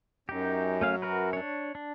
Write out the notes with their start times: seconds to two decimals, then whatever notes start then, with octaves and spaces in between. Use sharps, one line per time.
0.29 F#2 D#4 G4
0.81 A3 C#4 F5
1.02 F#4 A#4 B4
1.33 D4 C#5
1.75 D4